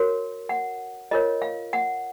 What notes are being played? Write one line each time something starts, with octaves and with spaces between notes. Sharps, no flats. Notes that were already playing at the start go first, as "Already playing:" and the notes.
Already playing: F#4 A#4 C#5
F#5
F4 A#4 C#5 D#5
F5
F#5